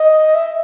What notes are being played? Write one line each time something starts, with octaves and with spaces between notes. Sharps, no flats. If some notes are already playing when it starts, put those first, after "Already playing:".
Already playing: D#5
E5